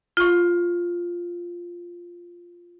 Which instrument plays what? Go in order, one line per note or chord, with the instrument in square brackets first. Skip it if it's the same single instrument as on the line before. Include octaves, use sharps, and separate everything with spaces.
[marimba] F4 C#6